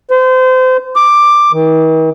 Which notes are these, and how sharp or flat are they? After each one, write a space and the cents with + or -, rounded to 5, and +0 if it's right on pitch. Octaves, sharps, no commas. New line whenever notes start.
C5 -30
D6 +10
D#3 +45